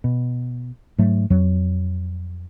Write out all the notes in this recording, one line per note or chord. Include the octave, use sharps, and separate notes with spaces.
B2
G#2 F#3 A3
F2 F#3